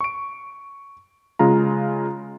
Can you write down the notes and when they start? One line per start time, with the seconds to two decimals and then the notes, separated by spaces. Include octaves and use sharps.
0.01 C#6 D7
1.39 C#3 G#3 F4 A#5